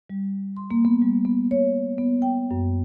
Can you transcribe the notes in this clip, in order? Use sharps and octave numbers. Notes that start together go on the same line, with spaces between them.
G3
C6
A#3
B3
G3
B3
C#5
B3
G5
F#2